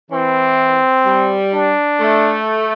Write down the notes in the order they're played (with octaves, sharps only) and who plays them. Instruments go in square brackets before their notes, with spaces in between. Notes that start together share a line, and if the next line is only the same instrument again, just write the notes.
[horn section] E3 [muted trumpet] C4
[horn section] G3
[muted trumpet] D4
[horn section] A3